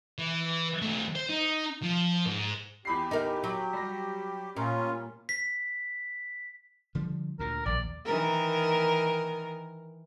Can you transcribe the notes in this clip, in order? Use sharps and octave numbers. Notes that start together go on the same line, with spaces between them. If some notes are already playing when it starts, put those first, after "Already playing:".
E3
D#3 A3
C5
D#4
F3
G#2
E2 G4 B5 C7
D#4 A#4
F#3
G3 A#6
A#2 C#4 F4
B6
D3 F3 G3
D2 A#2 A#4
A#1 D#2 D5
D#3 E3 A#4